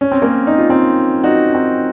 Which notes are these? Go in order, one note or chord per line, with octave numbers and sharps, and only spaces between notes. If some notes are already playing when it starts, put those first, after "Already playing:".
C#4
C4
A#3 C#4
D#4
F4
C4 D#4
D#4 F#4
C4 D#4